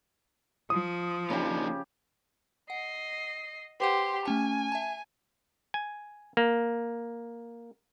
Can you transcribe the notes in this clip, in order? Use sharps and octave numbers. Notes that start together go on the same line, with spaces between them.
F3 D#6
C#3 A#3 D4 D#4 G4
D#5 F#5 C7
G4 B4 C5 F#5 C6
A3 C#4 G#5 A5
E5 A5
G#5
A#3